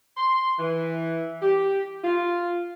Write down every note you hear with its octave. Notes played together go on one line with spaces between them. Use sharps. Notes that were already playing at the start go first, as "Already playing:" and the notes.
C6
E3
G4
F4